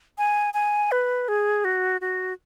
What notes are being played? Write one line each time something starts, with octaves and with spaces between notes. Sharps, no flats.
G#5
G#5
B4
G#4
F#4
F#4